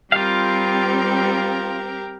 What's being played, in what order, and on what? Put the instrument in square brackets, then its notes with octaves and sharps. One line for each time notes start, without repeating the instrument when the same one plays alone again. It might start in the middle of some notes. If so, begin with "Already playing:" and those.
[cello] G3 C4 [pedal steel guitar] F4 F5 [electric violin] G4 A#4